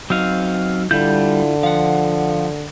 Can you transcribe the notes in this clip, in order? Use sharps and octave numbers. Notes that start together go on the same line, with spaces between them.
F#3 C4 D#4 F5
D3 G3 E4 F4 G6
F3 F5 F#5